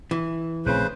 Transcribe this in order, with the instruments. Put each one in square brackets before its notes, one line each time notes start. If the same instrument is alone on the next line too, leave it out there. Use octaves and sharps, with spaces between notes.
[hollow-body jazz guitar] E3
[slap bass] A#1 A3 C4 [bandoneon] C#3 B4 C5